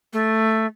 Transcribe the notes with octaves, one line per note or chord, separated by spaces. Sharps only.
A3